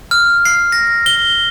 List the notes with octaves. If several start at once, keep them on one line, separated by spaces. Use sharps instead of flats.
F6
C7
A#6
G7